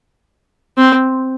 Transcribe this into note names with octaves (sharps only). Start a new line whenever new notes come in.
C4